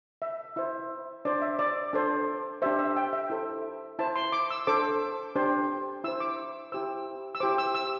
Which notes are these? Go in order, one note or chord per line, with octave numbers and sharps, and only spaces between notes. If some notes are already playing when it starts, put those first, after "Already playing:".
E5
E4 C5 E5
D4 C5 D5
E5
D5
D4 A4 C5
D4 G4 C5 E5
E5
G5
E5
E4 A4 C5
E4 C5 A5
C6
D6
E6
D4 A4 C5 D6
D4 G4 C5
E4 C5 E6
D6
E4 G4 C5 E6
E6
E4 G4 C5 D6
E6
E6